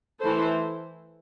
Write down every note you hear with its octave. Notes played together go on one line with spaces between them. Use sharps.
E3 A3 E4 A4 C5